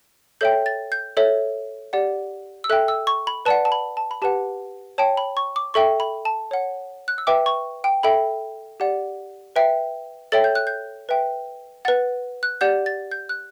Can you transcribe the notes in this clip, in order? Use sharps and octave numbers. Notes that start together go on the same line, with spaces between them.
A4 C#5 E5 G5 G6
A6
G6
A4 C#5 E5
G4 D5 F#5
E6
A4 E5 G5 F#6
E6
C#6
B5
B4 D5 F#5 A5
A5
B5
A5
B5
G4 B4 F#5 A5
C#5 G5 A5
B5
C#6
D6
A4 E5 G5 C#6
B5
A5
C#5 F#5
F#6
E6
B4 E5 G5 D6
C#6
G5
A4 E5 G5 B5
G4 D5 F#5
B4 E5 G5
A4 C#5 E5 G5 A6
G6
F#6
G6
B4 E5 G5
B4 F#5 A6
F#6
G4 D5 F#5 G6
A6
G6
F#6